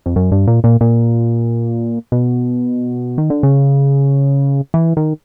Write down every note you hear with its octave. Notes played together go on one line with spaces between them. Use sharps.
F2
F#2
G2
A#2
A#2
A#2
B2
D#3
D3
C#3
E3
D#3